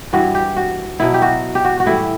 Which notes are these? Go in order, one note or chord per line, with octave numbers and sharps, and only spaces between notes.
G2 E3 G3 F#4
G4
F#4
B2 F#3 E4
G4
F#4
G4
F#4
F#4
A2 E3 G3 E4